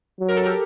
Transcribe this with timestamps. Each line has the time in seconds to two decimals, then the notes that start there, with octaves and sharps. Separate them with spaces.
0.20 F#3
0.28 A#4
0.36 A4
0.46 G4 A#4